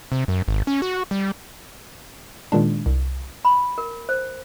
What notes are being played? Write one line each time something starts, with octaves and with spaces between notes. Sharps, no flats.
C3
F#2
G#1
C#4
F#4
G3
A#2 D#3 G#3 D4
C2
B5
A#4
C5